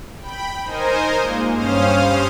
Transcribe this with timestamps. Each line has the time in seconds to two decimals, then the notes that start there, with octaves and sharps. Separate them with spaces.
0.18 G5 B5
0.64 D#4 A#4 C5 D#5 G#5
1.20 A#2 G#3 A#3
1.52 G2 C#4 C5 F5 D#6 F6